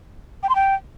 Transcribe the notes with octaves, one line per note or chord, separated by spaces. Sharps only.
G5
C6
G5